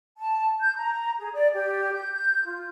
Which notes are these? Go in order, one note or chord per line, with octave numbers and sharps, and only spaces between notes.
A5
G6
A#5
G#4
D5
G4
G6
G6
F4